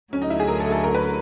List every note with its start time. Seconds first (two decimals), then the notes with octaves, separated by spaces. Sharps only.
0.13 D2 D3 F#3 C#4
0.22 D#4
0.30 E4
0.40 G#4
0.48 A#4
0.60 A4
0.72 A4
0.84 A#4
0.95 B4